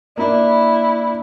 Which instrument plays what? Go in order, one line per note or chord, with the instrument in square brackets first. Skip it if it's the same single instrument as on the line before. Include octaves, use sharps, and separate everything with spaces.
[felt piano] A#3 D4 [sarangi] E4